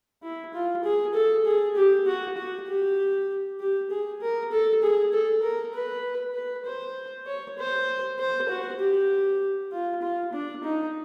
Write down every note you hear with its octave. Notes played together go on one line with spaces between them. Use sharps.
E4
F4
G#4
A4
G#4
G4
F#4
F#4
G4
G4
G#4
A#4
A4
G#4
A4
A#4
B4
B4
C5
C#5
C5
C5
F#4
G4
F4
F4
D4
D#4